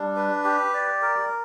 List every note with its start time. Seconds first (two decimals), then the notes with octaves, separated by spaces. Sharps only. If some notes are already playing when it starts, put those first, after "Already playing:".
Already playing: G3 D4
0.16 B4
0.44 G4
0.74 D5
1.02 A#4